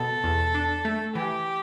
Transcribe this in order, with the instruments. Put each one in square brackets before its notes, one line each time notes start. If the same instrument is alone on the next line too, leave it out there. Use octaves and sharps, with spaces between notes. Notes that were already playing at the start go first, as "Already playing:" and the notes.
Already playing: [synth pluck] B2 [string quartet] A4
[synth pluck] E2
D4
A3
[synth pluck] E3 [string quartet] G4